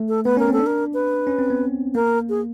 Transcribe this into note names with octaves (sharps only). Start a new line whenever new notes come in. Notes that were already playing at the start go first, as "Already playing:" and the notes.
Already playing: A3
A4
B3 B4
C#4 A#4
C4 A4
D4
A#4
B4
C#4
C4
B3
A#3 A#4
G#4